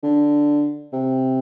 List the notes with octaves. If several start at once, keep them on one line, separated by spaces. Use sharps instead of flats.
D3
C3